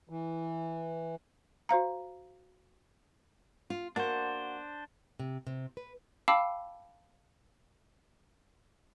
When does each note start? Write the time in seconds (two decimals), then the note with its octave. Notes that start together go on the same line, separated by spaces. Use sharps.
0.09 E3
1.69 F#4 C5 F5 A#5
3.70 F4
3.96 A#3 D4 F#4 C5
5.20 C3
5.47 C3
5.77 B4
6.28 F5 G5 A5 B5 D6 E6